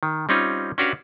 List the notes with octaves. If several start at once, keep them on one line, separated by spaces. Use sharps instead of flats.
D#3
G3 C4 C#4 D#4 F4
C#4 D4 F#4 G4 B4 F5